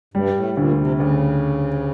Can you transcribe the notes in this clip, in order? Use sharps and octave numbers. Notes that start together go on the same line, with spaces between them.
G2 G3
A2
D2 A#2
C3
D2 C#3